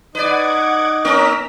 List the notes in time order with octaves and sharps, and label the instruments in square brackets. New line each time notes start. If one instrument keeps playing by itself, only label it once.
[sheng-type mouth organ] D#4 [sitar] B4 D5 [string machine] F#5 D6 G#6
[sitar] A#3 C#4 A#4 [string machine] A#5 E6 B6